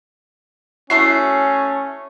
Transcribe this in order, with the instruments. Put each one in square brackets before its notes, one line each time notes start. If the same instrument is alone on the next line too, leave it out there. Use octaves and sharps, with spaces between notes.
[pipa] A3 E4 F#4 [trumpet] C#4 [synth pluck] C7